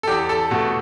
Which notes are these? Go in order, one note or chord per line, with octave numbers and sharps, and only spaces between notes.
A4
E2 G4
A4
B2 A3